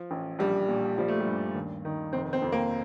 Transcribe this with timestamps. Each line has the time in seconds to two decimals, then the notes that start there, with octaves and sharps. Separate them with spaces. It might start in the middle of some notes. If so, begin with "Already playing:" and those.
Already playing: F3
0.11 A1
0.39 A#1 G3
0.68 A#2
0.98 F3 G3
1.08 A3
1.20 G3
1.26 G2
1.55 D#2
1.85 D#3
2.13 F1 C4
2.33 C4
2.42 F2
2.52 A#3